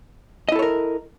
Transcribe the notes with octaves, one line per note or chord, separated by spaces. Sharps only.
E4 A4 A#4 C#5 D#5